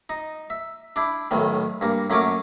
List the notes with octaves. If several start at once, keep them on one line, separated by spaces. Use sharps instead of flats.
D#4
E5
D4 E4
B1 A2 D#3
G2 A#3
F#2 A3 A#3 C#4 D6